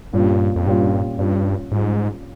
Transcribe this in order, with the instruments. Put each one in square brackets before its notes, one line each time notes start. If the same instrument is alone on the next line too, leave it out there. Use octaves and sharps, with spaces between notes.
[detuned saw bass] G2 [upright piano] A#2 G3 C#4 F4
[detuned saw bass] F2
[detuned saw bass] G2 [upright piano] A#2 G3 C#4 F4
[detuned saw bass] G2 [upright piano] G3 C#4 F4
[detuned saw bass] G#2 [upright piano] G3 C#4 F4